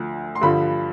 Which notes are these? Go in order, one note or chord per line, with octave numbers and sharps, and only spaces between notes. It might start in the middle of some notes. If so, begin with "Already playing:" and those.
Already playing: D2 D3 F3
C6
G2 D3 F3 B5